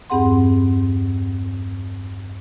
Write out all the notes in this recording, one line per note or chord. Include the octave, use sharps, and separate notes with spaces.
E2 G2 C4 G#4 F#5 C6